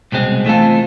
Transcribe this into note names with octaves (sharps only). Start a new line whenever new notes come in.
C2 B2 G#3 C4
E3 A3 C4 F4 A4